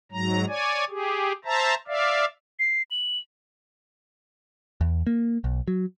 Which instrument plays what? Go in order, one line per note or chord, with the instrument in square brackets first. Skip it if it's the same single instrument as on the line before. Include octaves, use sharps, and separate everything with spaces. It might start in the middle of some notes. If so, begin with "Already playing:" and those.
[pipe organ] G#2 F#3 A#5
C#5 D5 G#5
G4 G#4
C5 E5 A5 A#5
D5 E5 F5
[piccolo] C7
F#7
[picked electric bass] E2
A#3
B1
F#3